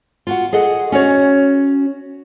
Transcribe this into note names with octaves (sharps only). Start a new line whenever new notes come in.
F4 F#4 F#5
G#4 A4 D#5 F#5
C#4 F#4 C#5